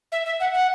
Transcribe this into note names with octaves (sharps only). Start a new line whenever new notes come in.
E5
E5
F#5
F#5